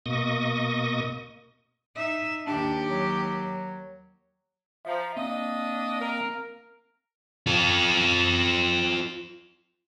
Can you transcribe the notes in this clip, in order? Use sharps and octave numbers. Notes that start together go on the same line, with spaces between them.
B2 A#3 D#5 C#6 D#6
D#4 E5
D#2 D4 G4
F#3
F3 E5 F5 A#5
A#3 C4 D4 D#5 F5
A#4
F4 A4